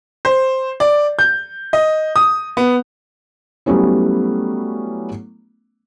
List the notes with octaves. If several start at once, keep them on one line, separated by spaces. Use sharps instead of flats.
C5
D5
G6
D#5
D#6
B3
F#3 G3 A3 B3 C#4 E4